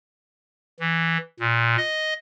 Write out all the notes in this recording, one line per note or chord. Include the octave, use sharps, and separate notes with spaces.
E3
A#2
D#5